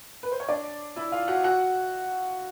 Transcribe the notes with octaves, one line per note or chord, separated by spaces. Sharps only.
B4
C5
C#5
D4 D5
E4 E5
F4 F5
F#4 F#5
F#4 F#5